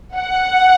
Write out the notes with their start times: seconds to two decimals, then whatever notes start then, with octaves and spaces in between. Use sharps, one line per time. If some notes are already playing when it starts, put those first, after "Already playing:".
0.16 F#5